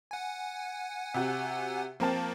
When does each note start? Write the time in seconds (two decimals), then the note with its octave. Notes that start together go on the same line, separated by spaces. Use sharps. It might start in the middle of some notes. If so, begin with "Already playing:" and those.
0.11 F#5 G#5
1.14 C3 F#4
2.00 F3 A#3 C4 A#4 A5